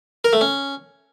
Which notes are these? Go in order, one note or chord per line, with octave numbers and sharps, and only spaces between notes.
A#4
A3
C#4